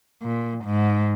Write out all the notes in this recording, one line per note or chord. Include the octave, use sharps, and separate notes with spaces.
A#2
G#2